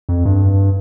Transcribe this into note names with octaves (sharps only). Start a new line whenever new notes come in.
F2
G2